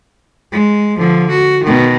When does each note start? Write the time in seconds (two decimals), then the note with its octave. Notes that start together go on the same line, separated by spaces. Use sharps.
0.52 G#3
0.98 D3 F3
1.30 F#4
1.64 B2 D#3